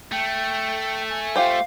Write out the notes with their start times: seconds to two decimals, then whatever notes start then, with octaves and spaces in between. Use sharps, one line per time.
0.12 A3 G5
1.10 G#5
1.36 F4 G4 C5 F5